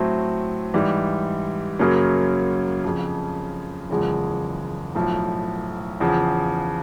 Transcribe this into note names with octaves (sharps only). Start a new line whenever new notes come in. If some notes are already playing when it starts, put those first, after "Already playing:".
Already playing: A2 F#3 A3 C4
G#2 E3 G3
F#2 C#3 F#3 A#3 C#4
F2 C#3 F3
F#1 E2 C#3 F3 G#3
B1 A2 F3
E2 C#3 F3